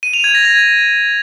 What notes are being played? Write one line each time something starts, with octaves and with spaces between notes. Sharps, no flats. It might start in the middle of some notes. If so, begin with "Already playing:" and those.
D#7
F7
G#6
A#6
G#6